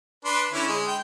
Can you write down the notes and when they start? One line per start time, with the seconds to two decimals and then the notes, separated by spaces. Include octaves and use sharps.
0.25 D4 B4 C6
0.52 D3 C#4 E4
0.68 G#3
0.87 G5